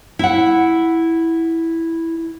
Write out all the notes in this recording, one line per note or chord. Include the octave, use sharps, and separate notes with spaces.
E4 F#5